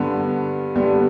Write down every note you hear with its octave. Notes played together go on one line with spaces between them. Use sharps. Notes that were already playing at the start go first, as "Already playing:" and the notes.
Already playing: G2 D3 G3 B3
G2 D3 G3 B3